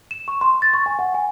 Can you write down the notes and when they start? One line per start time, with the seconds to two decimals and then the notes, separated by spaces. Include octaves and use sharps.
0.11 E7
0.28 C#6
0.41 C6
0.62 A6
0.74 C#6
0.86 G#5
0.99 F#5
1.14 G#5